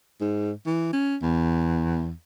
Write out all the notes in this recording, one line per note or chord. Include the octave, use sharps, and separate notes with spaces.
G#2
E3
C#4
E2